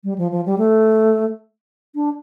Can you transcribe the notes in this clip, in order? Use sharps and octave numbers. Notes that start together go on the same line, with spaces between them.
G3
F3
F3
G3
A3
D4